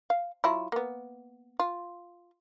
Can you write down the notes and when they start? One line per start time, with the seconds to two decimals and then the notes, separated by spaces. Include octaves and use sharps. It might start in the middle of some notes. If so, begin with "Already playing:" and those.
0.10 F5
0.44 F#3 E4 F4
0.72 A#3 B3
1.59 F4